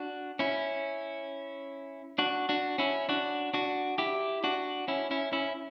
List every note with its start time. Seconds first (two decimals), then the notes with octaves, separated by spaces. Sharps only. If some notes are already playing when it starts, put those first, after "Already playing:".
Already playing: D4 F#4
0.39 C#4 E4
2.18 D4 F#4
2.49 D4 F#4
2.78 C#4 E4
3.09 D4 F#4
3.54 D4 F#4
3.98 E4 G4
4.44 D4 F#4
4.88 C#4 E4
5.11 C#4 E4
5.33 C#4 E4